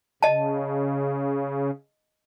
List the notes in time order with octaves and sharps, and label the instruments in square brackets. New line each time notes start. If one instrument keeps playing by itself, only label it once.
[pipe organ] C#3 [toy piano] D#5 A5